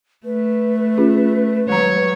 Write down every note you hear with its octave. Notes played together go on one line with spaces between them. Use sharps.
A3 B4
C#4 F4 G#4
F#3 G#3 C#5 A#5